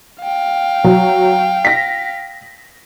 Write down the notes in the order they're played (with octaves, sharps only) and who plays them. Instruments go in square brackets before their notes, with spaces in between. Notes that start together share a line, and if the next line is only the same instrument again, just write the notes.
[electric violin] F5 G5
[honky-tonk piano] F#3
A#6 B6